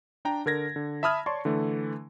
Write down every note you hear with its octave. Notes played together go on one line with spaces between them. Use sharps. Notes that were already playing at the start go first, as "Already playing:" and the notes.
D4 G5 A#5
D3 A#4 G#6 A#6
D3
E5 A5 B5 D#6 F6 G#6
C#5 D5 A5 C6 C#6
D3 E3 A3